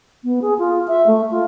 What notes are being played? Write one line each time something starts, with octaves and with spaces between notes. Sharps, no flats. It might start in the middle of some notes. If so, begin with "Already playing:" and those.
B3
G#4
F4
E5
A3
F4